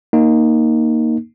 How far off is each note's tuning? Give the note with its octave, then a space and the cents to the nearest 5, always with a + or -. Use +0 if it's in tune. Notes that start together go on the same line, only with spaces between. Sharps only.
A#3 +0 D#4 +0